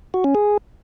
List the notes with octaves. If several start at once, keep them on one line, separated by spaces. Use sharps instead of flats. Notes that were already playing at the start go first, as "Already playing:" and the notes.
F#4
C#4
G#4